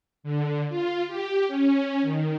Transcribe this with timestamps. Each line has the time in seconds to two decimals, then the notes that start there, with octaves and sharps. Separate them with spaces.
0.23 D3
0.69 F4
1.07 G4
1.48 C#4
2.02 D#3